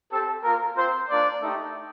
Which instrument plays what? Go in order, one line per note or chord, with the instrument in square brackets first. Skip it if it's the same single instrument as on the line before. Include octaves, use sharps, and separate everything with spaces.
[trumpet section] C4 G4 A4
A#3 F4 A#4
C4 F4 C5
A#3 D4 F4 D5
A3 D#4 G4